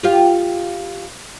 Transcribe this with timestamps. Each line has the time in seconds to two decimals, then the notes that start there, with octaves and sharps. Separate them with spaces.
0.03 F4 G4 F5